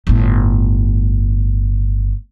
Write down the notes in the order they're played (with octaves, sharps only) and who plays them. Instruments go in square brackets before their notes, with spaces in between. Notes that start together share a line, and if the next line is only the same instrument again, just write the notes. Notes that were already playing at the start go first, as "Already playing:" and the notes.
[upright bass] G1 A2